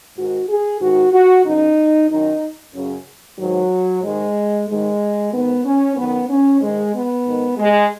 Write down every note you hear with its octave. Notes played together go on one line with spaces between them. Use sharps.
G#2 D#3 F#4
G#4
G#2 D#3 F#4
F#4
F#2 C#3 D#4
F#2 D#3 D#4
F#2 C#3
G#2 D#3 F#3
G#2 D#3 G#3
G#2 D#3 G#3
G#2 D#3 B3
C#4
F#2 D#3 B3
C#4
G#2 D#3 G#3
B3
G#2 D#3
G#3